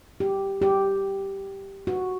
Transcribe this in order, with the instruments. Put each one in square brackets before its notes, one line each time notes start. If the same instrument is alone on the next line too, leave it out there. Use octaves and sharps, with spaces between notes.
[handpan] G4
G4
F#4